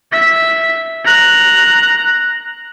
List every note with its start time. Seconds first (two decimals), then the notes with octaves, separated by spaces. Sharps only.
0.12 E5 B6
1.05 A#5 F#6